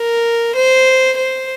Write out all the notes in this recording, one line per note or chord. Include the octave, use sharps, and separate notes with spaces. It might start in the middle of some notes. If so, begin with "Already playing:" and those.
Already playing: A#4
C5
C5